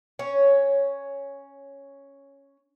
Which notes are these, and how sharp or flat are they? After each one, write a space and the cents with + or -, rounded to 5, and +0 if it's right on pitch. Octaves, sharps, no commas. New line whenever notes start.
C#4 +0 C#5 +5